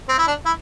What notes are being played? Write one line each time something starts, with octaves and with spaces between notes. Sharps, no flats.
C4
E4
D4
E4